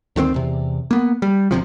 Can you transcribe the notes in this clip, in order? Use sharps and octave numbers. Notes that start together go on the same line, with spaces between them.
D2 D#3 F3 C4
E2 C3
A#3 B3
G3
G1 C3 F3